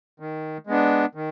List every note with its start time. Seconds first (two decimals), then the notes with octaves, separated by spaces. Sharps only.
0.20 D#3
0.67 G#3 B3 D4
1.15 D#3